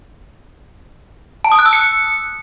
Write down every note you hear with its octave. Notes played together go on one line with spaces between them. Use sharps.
A5
D#6
F#6
E6
C#7